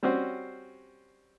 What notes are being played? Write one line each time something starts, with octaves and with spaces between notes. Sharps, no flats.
G3 C4 C#4 F#4 C5